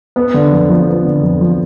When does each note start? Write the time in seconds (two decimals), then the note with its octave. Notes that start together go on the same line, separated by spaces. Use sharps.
0.16 B3
0.34 D3
0.52 F2
0.69 F3
0.87 B3
1.05 D3
1.23 F2
1.41 F3